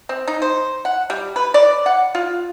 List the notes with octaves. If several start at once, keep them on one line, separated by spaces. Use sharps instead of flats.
C4
D#4
C5
F#5
G3
B4
D5
F#5
F4